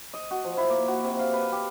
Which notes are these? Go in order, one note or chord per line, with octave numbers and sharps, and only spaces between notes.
D#5
F#4
F3
E4
A#3
F#4
C3
F5
B4
G4